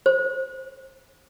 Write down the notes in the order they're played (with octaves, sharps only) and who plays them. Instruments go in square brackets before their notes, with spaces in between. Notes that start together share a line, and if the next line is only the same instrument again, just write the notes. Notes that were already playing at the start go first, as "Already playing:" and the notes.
[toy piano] C5